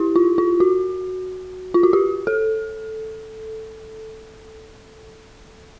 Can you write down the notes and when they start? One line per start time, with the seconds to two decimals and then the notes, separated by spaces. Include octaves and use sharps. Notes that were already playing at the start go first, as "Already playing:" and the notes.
Already playing: E4 G4
0.16 F4
0.38 F4
0.60 F#4
1.74 F4
1.83 F#4
1.93 G4
2.27 A4